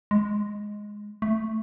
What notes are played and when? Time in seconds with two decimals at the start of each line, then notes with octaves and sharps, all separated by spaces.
0.11 G#3
1.22 A3